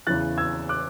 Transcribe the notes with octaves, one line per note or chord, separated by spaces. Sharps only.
E2 C#3 E3 F#6 A6
E6 G#6
D6 F#6